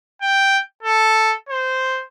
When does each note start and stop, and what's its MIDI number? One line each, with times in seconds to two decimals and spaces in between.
0.22 0.60 79
0.83 1.34 69
1.49 2.03 72